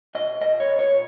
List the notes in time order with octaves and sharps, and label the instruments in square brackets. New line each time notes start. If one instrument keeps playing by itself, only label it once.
[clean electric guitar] A#2 D#5
A#2 D#5
C#5
A#2
C#5
A#2